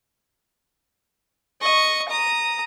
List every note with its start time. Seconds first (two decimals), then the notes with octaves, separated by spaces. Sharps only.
1.62 D#5 C#6
2.09 A#5 D#6